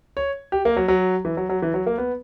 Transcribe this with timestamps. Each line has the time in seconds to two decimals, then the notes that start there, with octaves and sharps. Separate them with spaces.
0.17 C#5
0.52 G4
0.65 A#3
0.77 F#3
0.88 F#3
1.25 E3
1.37 F#3
1.49 F#3
1.62 E3
1.74 F#3
1.86 A#3
1.98 B3